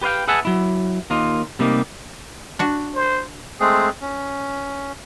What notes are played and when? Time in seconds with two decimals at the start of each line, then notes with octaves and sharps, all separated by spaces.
0.01 G4 B4 C#5 F5 G5
0.28 G#4 B4 E5 F#5 G#5 A5
0.45 F#3 E4
1.10 D#2 A#3 D#4 F4
1.59 C3 G3 A3 A#3 D#4
2.59 D4 F#4
2.95 C5
3.60 G#3 A3 C4 G#4
4.01 C#4